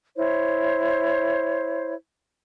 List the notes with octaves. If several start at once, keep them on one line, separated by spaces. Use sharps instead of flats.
E4 C5 C#5